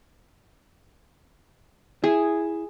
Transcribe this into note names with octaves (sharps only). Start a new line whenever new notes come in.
E4 G#4